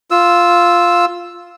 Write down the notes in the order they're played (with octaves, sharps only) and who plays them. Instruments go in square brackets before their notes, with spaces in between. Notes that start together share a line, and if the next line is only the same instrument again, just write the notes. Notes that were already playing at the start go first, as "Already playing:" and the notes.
[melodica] F4 E6